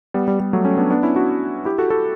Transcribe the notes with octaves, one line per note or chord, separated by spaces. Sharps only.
G3 B3
G3
G3
F#3 A3
A3 C#4
B3 D4
B3 D4
C#4 E4
D4 F#4
E4 G4
F#4 A4
F#4 A4